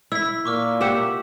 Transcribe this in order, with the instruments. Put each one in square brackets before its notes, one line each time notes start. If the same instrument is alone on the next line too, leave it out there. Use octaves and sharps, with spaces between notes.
[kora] E4 [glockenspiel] E6 B6
[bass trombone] A#2 [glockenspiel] C#6 D6 F6
[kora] G4 E5 F#5